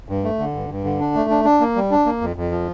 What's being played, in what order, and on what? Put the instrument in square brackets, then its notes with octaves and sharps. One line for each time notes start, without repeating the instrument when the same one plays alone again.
[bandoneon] G2
A3
D3
G2
G2
D3
D4
A3
D4
D4
A#3
G3
D4
A#3
F2
F2
F3